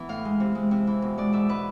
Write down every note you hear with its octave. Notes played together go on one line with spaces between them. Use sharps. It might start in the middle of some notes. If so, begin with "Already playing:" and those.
Already playing: E3 B3
A2 F5
G#3
C3
G#3
C3
E3
B2
G#3 D5
G#2 E5
G#3 B4